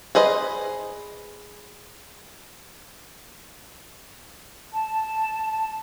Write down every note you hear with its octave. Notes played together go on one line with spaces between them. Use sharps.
G#4 B4 C5 D#5
A5